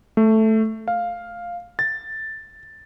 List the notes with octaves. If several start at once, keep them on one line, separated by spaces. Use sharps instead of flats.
A3
F5
A6